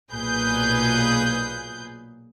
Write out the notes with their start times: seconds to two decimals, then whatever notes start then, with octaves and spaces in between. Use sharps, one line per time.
0.12 B1 A#2 G#4 B4 G6